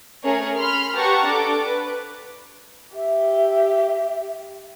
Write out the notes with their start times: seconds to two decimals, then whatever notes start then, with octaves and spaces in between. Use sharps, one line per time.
0.23 A3 C#4 G#4 A#4 C#5
0.57 B5 C6 F6
0.95 G4 B4 F#5 A5 A#5 C#6
1.26 D4 A4 D6
1.67 B4
2.95 G4 E5